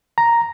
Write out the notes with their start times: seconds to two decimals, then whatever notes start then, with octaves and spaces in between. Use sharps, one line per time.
0.18 A#5